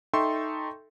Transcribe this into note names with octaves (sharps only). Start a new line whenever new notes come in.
D#4 A4 E5 G5 C6 C#6